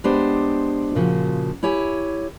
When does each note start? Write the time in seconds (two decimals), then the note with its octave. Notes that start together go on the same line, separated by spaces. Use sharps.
0.04 G#3 B3 D4 G4 C5
0.95 A#2 C#3 F3 F#4
1.63 E4 G4 C#5 G#5